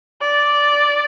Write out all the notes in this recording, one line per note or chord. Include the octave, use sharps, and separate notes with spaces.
D5